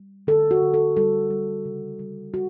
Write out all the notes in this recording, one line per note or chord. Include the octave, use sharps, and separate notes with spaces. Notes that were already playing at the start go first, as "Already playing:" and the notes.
Already playing: G3
D3 A4
F#4
D3
A4
G3 A4
G3
C#3
G3
G3 F#4